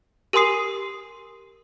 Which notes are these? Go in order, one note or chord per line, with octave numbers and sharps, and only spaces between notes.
G4 A#4 G#5 C6 D#6 C7